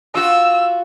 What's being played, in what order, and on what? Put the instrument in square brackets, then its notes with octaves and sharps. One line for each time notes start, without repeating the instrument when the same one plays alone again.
[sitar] F4 F#4 [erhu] E6